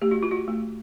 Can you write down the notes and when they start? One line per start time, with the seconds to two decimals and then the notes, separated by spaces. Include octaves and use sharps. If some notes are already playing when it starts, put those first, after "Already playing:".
0.02 A3 G4
0.11 F#4
0.23 F4
0.31 F#4
0.48 A3